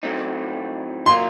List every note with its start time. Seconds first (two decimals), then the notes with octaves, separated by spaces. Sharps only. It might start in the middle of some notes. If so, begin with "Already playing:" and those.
0.03 A2 F#3 A3 C4 D#4
1.06 F#3 A#3 F4 A#4 C6